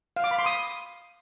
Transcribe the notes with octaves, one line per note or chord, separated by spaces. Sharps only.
F5
D6
B5
C6
D#6